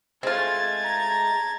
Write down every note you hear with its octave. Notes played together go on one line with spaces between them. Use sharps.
G#3 A3 C4 F4 G#6 A6
A#5